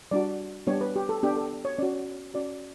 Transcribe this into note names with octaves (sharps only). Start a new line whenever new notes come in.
G3 D4 F#4 D5
G3 B3 D4 G4 C#5
B4
G4
A4
B3 D4 G4
A4
C#5
C#4 F#4 D5
C#4 F#4 D5